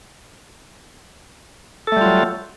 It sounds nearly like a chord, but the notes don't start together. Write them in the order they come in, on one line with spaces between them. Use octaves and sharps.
A4 A3 G3 F4 F#3